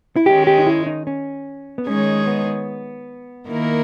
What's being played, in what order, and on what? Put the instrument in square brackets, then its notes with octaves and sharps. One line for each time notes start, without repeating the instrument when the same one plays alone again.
[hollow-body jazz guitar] E4
[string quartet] D#3 G#3 C#4 [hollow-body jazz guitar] G4
[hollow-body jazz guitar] G4
D#4
E4
D#4
C#4
B3
[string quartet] D#3 G#3 D#4 G#4 C#5 [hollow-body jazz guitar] C#4
[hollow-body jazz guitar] B3
[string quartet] D#3 A#3 E4 A#4